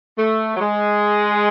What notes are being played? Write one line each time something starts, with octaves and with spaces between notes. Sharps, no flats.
A3
F#3
G#3